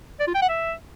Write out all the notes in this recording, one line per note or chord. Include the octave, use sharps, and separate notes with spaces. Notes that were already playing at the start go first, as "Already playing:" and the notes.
D5
F4
G5
F#5
E5